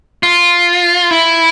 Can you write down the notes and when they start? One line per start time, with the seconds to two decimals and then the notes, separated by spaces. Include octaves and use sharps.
0.23 F4
1.11 E4